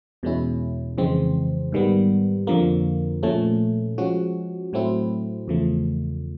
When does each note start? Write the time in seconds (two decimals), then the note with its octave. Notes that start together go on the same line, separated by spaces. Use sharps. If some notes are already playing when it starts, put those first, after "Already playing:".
0.23 E2 B2 G#3 C#4 E4
0.97 F2 C#3 E3 G#3 C4
1.72 G#2 D#3 G3 B3
2.47 F2 D3 F3 A#3
3.23 A#2 F3 A3 C#4
3.98 F3 G#3 C#4 F#4
4.73 A2 F#3 A3 C4 E4
5.48 E2 C#3 F3 A3